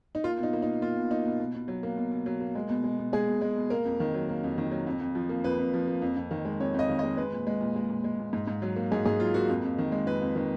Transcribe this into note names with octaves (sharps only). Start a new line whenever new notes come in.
D#4
A#3 F4
B2
D#4
A#3
D#4
B2
A#3 F4
B2
A#3 D#4
B2
B2
B2
F#3
A#3
B2
B2
F#3
A#3
G#3
B2
G#3
B2
G#3 G#4
B2
G#3
B2
A#3 A#4
F2
D#3
F#3
A#3
F2
D#3
F#3
F2
F2
F3
A#3
F2 B4
F2
F3
A#3
F2
F2
D#3
G#3
F2 C#5
F2 D#5
D#3
D#5
G#3
G#3 B4
A#2
G#3
A#2
G#3
A#2
G#3
A#2
G#2
G#2
F#3
A#3
G#2 G#4
G#2 G#4
F#3 F4
A#3 F#4
F2
F2
D#3
G#3
F2 B4
F2
D#3